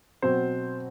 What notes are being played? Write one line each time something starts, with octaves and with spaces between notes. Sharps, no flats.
B2 F#3 C4 C5